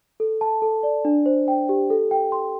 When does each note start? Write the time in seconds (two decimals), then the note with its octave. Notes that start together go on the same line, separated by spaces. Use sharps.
0.20 A4
0.41 A5
0.62 A4
0.83 D5
1.05 D4
1.26 C5
1.48 G5
1.69 G4
1.90 A4
2.11 G5
2.32 C6